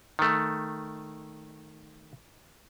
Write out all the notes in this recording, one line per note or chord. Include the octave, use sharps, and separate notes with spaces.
D#3 A3